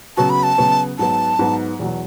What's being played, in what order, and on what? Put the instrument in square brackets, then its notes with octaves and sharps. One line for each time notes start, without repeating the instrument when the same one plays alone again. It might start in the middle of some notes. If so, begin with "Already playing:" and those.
[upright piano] C#3 F#3 B3 F#4 [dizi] A5
[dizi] B5
A5
[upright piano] C#3 F#3 B3 F#4
[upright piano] G#2 F#3 B3 [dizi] A5
[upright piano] G#2 F#3 B3
E2 B2 F#3